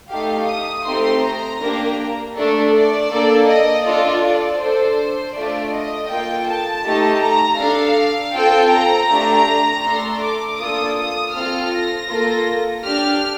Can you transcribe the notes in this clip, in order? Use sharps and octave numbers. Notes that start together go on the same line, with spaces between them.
A3 D#4 G4 F5
D#6
A3 C4 D#4 G4 C6
A#5
A#3 D4 G4
A3 D4 A4
D5
A#3 D4 A4
D#5
D4 F4 A4 D5
D5
D4 A4 C5
A3 D4 F4 D5
D#5
A#3 F4 A4 G5
A5
A3 D#4 G4
A#5
D4 A4 F5
C4 F4 A4 G5
A#5
A3 D4 G4
A3 D4 A4 C6
D6
A#3 D4 F4 A4 D#6
D#6
C4 F4 A4 F6
A#6
A#3 F4 A4
D4 G4 F6